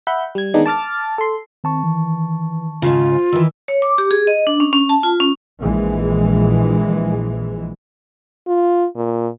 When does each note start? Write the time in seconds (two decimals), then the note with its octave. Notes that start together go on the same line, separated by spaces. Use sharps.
0.07 E5 F#5 B5 G6
0.35 G3 G#6
0.54 D#3 G#3 B3 D4 D#4
0.66 A5 D6 F6 A6
1.18 A4 C6
1.64 D#3 C4 A5 C#6
1.84 E3
2.82 G#2 C#3 F4 F5
3.12 C5
3.33 D#3 E3 E6
3.68 C#5
3.82 D6
3.98 G4
4.11 G#4
4.27 D#5
4.47 D4
4.60 C#4
4.73 C#4
4.89 A5
5.03 F4
5.20 C#4
5.63 A#1 E3 G#3
8.48 F4
8.96 A#2